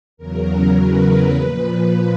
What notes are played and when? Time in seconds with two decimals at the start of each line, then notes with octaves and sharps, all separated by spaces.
0.17 E2 C#3 F#3 A#4
0.76 B4
1.34 A#2 F3